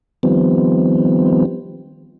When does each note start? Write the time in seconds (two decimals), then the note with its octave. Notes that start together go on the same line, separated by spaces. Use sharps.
0.23 D#3 F3 G3 B3 C4